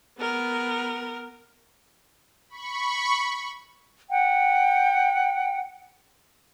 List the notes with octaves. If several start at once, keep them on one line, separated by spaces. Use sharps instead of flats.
B3 A#4
B5 C#6
F#5 G5